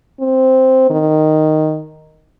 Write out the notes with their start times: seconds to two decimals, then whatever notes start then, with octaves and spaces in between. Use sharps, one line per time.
0.20 C4
0.90 D#3